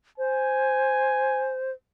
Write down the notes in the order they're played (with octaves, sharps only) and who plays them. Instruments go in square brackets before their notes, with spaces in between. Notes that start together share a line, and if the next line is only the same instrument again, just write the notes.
[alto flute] C5 [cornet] G#5